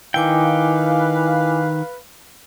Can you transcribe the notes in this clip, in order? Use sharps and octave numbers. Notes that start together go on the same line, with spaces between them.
D#3 E4 B4 F5 G5 G#5 D6